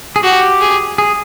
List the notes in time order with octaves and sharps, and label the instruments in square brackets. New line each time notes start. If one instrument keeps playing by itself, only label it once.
[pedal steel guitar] G#4
[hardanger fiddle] F#4 [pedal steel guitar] G4
[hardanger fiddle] G#4
[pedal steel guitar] G#4